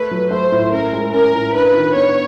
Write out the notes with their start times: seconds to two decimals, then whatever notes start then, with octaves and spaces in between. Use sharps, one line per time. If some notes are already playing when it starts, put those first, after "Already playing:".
Already playing: A3 B4
0.11 F#3
0.31 A3 C5
0.52 A2
0.72 C#4 A#4
0.93 G#3
1.14 C#4 A#4
1.34 A2
1.55 D4 B4
1.74 D#3
1.95 B3 C#5